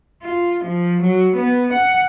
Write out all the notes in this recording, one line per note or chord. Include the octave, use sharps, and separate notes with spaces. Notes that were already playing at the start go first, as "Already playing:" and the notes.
F4
F3
F#3
B3
F#5